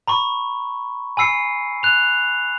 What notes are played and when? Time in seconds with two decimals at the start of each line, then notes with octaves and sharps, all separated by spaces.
0.07 A#5 B5 C#6
1.17 G#5 B5 E6 C7 C#7
1.83 F#6 F7